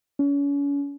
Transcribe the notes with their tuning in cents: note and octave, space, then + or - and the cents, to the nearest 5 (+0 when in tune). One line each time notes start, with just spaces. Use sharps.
C#4 +35